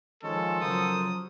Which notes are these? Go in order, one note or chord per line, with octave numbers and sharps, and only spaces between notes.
D#3 F3 G#3 C#4 A4
C#3 F3 F#3 A#4 C5 D#6